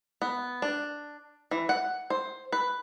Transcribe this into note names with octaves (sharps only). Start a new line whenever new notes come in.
B3
D4
E3
F#5
C5
B4